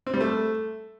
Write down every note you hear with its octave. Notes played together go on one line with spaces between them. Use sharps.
C4
G3
A3